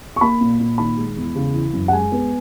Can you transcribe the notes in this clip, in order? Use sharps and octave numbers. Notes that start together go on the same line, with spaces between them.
C#6
A#3 B5
A#2
A#2
D#3 B5
G#3
E2
C#3
E3
F#2
F#5
G#3 G#5
B3